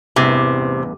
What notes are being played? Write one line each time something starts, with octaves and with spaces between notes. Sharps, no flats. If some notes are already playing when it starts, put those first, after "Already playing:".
A1 E2 G2 C3